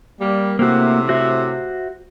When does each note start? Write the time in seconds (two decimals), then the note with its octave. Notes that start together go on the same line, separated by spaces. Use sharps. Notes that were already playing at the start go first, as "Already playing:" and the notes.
0.20 G3 A#3
0.59 A2 C3 A#3 F#4
1.09 F#4 C5 E5